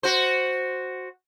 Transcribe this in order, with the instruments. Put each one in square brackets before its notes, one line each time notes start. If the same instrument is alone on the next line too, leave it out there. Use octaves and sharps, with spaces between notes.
[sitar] F#4 C5